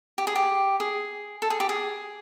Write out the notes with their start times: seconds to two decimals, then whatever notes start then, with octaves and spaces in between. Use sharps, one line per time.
0.18 G4
0.27 G#4
0.36 G4
0.80 G#4
1.42 A4
1.50 G#4
1.60 G4
1.69 G#4